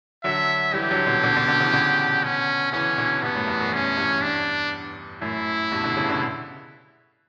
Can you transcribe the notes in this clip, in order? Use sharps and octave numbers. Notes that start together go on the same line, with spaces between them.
D3 F#3 E5
E3 G3 G4
D3 F#3
B2 D3
B2 D3
B2 D3
B2 D3
C#3 E3
B2 D3
C#4
C#3 E3 C#4
B2 D3
G2 B2 B3
F#2 A2
E2 G2
F#2
F#2 C#4
E2 G2
D4
F#2 A2 E4
G2 B2
B2 D3
C#3 E3
B2 D3